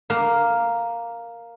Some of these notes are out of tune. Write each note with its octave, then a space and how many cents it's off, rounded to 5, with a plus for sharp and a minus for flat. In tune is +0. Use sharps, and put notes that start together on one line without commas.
A#3 +0 A#4 +0